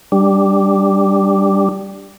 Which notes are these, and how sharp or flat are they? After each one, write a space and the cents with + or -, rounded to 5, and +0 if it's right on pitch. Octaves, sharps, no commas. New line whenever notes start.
G3 +0 D4 +0